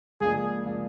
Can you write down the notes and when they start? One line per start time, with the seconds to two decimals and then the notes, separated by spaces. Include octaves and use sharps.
0.21 C#2 C#3 F3 A#3 D4 G#4
0.65 C#3 F3 A#3 D4